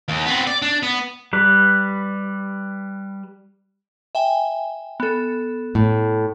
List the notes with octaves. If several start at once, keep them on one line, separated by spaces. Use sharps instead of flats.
D#2
B3 C4
D5
D4
B3
G3 B4
E5 G5 G#5
B3 A4
A2